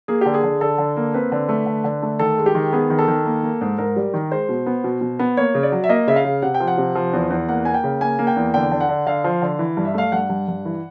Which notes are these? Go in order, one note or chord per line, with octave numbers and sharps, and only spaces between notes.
A#3 G#4
D3 G4
G#4
D3
D3 A4
D3
A#3
C4 B4
D3
A3
D3
D3
A3
D#3 A4
G#3
G4
D#3
B3 G#4
D#3
A4
D#3
A#3
A#3
G#2
G#2 A#4
G3
D#3
G#3 C5
B2
B3
B2
B2
B3
A#3 C#5
C#3
D5
F#3
E5
A#3 D#5
C#3 E5
F5
C#3
C3 F#5
G5
F3
F#5
C3
F3
E2
E2
A#3 F#5
A#3 G#5
G5
C#3
A#3 G#5
A#3
G5
E2
D3 G5
D3
F#5
D3
D3 F5
F3
D3
E3
G2
E5
A3 F5
G2 F#5
G2
G2
E3